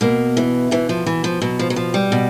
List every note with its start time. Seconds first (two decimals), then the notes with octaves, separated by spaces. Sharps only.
0.01 B2 A#3
0.37 E3
0.71 B2 E3
0.89 F3
1.06 E3
1.24 F3
1.42 B2 F#3
1.59 F3
1.70 F#3
1.76 F3
1.94 G3
2.12 B2